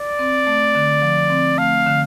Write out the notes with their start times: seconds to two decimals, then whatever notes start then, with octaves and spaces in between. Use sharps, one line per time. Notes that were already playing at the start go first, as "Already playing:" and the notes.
Already playing: D5
0.19 C4
0.47 A3
0.75 D3
1.02 F3
1.30 C4
1.58 A3 F5
1.86 D3